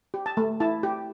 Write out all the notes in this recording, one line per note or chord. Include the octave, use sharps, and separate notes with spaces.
G4
A5
A3
E4 A5
G4